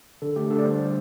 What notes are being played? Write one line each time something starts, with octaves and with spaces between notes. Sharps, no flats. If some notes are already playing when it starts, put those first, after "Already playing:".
D3 A4
A3 G4
D3 A4
D5
G3 C5